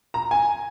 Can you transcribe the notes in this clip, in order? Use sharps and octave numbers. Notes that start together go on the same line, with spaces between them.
A#5
G#5